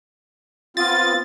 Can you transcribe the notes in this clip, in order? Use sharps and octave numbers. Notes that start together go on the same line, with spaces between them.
B3 C4 F4 A6